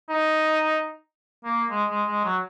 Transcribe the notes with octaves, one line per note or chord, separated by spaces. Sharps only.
D#4
A#3
G#3
G#3
G#3
F#3